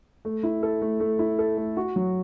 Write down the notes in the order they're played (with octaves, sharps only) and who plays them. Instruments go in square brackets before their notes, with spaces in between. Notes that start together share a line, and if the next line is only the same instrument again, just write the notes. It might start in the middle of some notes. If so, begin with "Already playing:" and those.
[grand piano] A3
E4
A4
A3
A3
E4
A4
A3
F#4
F#3